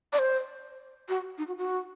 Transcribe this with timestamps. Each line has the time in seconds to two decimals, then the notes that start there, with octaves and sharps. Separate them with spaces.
0.13 D5
0.19 C5
1.09 F#4
1.38 D#4
1.47 F#4
1.58 F#4